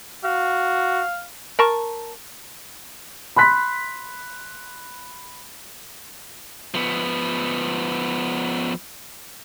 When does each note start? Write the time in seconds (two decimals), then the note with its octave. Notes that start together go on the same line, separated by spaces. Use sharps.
0.24 F#4 F5
1.59 A#4 A5 C#6
3.36 B5 C6 F#6 B6
6.74 F3 B3